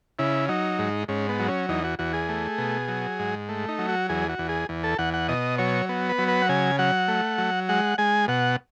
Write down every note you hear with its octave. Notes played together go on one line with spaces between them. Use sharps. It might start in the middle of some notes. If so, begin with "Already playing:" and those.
C#3 E4
F#3 D#4
G#2
G#2 C#4
B3
F#3
C#4
E2 D#4
F#4
E2 F#4
G#4
A3
B2
F#3
G#2
A3
D#4
F#3
F#4
E2 G#4
F#4
E2
G#4
E2
A4
E2 F#5
F#5
B2 D#5
F#3 C#5
B3
B4
F#3
B4
F#5
C#3 G#5
F#3 F#5
A3
F#3
G#3 F#5
G#3 G#5
B2 F#5